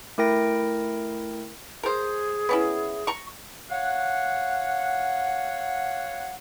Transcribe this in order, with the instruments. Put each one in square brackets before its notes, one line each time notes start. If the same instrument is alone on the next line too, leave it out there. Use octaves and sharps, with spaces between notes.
[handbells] A3 E4 A#4 G5 A#6 D7
[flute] G#4 [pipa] A#4 C5
[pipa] B3 C#4 E4
A#5 C#6
[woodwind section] C#5 F5 F#5